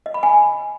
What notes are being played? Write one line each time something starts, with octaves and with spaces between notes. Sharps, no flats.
D#5
B5
G#5